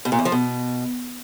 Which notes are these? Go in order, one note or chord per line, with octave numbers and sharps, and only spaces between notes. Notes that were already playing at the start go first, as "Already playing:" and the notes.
B2
A#2
E2
F3
B2